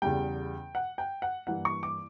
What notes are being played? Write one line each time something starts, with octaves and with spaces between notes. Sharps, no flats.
E2 C#3 G3 G5
F#5
G5
F#5
G2 E3 A#3 F#5
C#6
D6